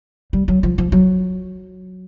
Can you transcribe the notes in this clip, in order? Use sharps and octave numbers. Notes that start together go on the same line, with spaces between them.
G3
F#3
F3
F3
F#3